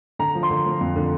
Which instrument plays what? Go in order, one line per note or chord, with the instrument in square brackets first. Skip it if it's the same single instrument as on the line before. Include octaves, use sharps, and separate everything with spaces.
[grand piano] D3 A#5
F3
C6
D3
F3
F2
D3